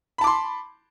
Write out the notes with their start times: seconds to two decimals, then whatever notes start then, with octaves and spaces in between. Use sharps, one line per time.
0.18 B5
0.21 A5
0.24 D6
0.27 C6